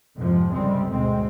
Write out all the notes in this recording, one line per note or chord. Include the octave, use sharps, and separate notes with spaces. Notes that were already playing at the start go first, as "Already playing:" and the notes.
F2 G#2 C3 F3
G1 C#2 C3 G3 G#3 C4
D2 G#2 B2 G#3 C4